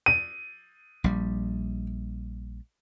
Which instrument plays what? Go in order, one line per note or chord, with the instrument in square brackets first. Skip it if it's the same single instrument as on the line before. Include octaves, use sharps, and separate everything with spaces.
[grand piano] D#7
[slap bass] A#1 G3